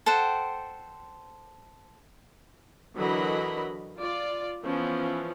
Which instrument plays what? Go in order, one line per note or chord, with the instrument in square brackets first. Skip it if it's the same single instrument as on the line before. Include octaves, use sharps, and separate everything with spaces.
[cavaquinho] A4 C5 F#5 G5
[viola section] D3 E3 F#3 A#4 D#5 B5
F4 D5
E3 F3 B3 C#4